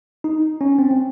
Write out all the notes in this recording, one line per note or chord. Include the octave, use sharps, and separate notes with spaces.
D#4
C#4
C4
C4